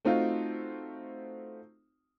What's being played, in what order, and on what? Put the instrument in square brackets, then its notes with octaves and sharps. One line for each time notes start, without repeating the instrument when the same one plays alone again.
[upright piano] A3 C4 D#4 F4 F#4